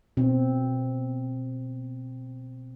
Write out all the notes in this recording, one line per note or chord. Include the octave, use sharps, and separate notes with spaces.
B2 C4